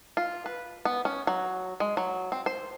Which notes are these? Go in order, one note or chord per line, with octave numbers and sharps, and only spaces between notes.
F4
B4
B3
C#4
F#3
G#3
F#3
C4
C5